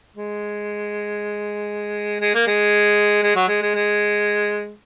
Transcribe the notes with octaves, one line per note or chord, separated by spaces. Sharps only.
G#3
G#3
A#3
G#3
G#3
F#3
G#3
G#3
G#3